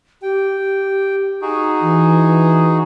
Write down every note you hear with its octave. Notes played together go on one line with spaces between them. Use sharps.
G4 G5
D#4 F#4 G#4
E3